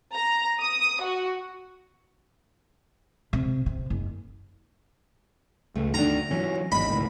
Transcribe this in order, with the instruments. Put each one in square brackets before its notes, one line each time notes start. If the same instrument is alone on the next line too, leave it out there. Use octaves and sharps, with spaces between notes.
[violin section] A#5
D#6
F#4
[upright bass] C3
C3
F#1
[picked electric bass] C#2 [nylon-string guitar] A3
[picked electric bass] D2 [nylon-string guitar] D#3 D4 [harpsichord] A#5
[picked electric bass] E3 F#3 [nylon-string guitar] C#4
[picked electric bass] G#1 E2 G#2 [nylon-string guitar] D#5 [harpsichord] B5
[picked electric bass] C#2 A2 D#3